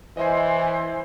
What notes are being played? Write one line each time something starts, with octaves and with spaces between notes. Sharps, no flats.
E3 C5 D#5 E5 G#5